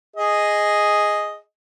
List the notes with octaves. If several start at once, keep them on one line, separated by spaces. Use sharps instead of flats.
G#4 D#5